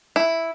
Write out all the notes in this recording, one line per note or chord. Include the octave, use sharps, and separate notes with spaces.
E4